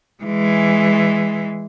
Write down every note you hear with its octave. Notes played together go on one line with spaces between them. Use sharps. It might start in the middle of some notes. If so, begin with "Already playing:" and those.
E3 G#3